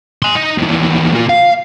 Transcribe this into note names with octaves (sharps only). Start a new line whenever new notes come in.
G#5 C6
D#4
D#2 E3
A#2 F4
F5